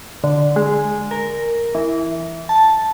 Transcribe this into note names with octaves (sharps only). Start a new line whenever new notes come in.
D3
G#3
A#4
E3
A5